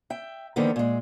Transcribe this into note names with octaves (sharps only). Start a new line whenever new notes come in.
E5 G5
D3 D#3 F3 A#3 B3
A#2 G#3